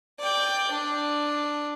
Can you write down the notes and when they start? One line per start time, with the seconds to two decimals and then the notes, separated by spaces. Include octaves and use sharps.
0.19 D5 G5
0.71 D4